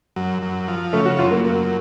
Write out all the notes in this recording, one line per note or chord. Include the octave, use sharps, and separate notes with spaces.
F#2
F#2
F3
C#3 A3
F#4
F#2 F4
A#3
F#2